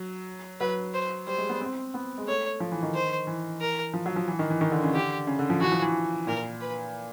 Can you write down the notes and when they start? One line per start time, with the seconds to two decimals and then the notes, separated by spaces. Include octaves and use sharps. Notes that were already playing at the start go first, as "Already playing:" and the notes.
Already playing: F#3
0.60 F#3 B4
0.94 C5
1.27 G3 C5
1.38 G#3
1.49 B3
1.61 C4
1.94 B3
2.18 G#3
2.28 A3 C#5
2.60 F3
2.72 E3
2.83 D#3
2.94 C5
3.27 E3
3.61 A#4
3.94 F3
4.06 F#3
4.16 F3
4.28 E3
4.39 D#3
4.50 E3
4.61 D#3
4.71 D3
4.83 C#3
4.93 D3 G4
5.27 C#3
5.39 D3
5.50 F3
5.61 E3 F#4
5.72 F3
5.82 E3
6.27 A#2 A#4
6.61 B4